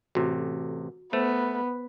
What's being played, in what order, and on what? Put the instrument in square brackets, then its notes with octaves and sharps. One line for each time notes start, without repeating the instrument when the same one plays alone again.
[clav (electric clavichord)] A1 C3 [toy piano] F#4
[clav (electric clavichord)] A3 [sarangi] B3 [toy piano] C5